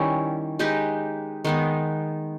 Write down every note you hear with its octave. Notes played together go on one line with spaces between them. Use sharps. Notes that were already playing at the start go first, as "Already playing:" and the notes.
Already playing: D#3 G3 C#4 E4
G#3 D#4 G4 B4
D#3 G#3 B3 D#4